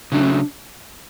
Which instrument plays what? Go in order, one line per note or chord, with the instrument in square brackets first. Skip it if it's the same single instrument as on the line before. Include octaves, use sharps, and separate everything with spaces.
[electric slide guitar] C#3 F#3 A3 [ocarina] D4
[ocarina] C#4
D4